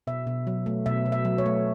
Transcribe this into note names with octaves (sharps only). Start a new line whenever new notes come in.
B2 E5
B2
F#3
A3
B2 E5
B2
E5
F#3
C#5
A3